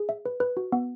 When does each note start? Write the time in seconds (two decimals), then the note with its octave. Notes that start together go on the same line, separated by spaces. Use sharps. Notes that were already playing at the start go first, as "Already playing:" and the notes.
Already playing: G#4
0.09 E5
0.25 B4
0.40 B4
0.57 F#4
0.72 B3